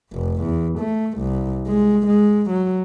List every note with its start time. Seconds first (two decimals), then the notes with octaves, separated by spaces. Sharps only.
0.12 F1
0.42 E2
0.79 A3
1.18 C2
1.67 G#3
2.07 G#3
2.50 F#3